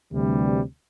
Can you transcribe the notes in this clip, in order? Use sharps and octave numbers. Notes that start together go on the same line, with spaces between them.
D2 C3 E3 G3